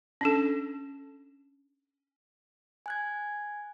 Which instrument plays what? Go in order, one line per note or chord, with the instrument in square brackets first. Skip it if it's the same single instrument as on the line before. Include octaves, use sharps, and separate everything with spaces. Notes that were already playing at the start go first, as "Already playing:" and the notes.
[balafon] C#4 D4 A4
[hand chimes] G#5 F#6 G#6